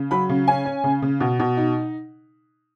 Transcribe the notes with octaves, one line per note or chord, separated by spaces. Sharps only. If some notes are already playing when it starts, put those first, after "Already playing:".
Already playing: C#3
F#3 B5
C#3
C#4 G#5
C#4
C#3
C#3
B2
B2
D#4